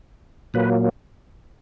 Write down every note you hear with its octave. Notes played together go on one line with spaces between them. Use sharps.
A#2 F#3 A#3 B4